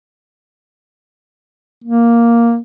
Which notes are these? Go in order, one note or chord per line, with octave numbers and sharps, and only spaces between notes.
A#3